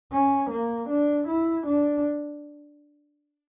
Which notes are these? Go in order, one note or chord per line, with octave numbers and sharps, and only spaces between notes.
C#4
A#3
D4
E4
D4